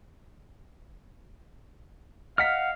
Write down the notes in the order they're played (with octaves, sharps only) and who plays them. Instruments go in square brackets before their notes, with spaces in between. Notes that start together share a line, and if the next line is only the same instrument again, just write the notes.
[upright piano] D#5 B6 [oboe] F5 [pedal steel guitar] F#5 F6